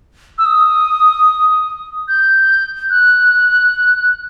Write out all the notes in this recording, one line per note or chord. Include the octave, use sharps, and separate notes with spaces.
E6
D#6
G6
F#6